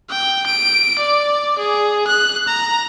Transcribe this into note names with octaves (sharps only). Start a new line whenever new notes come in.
G5
D7
D5
G#4
F#6
A#5